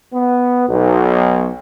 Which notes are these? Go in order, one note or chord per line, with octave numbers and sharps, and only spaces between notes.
B3
B1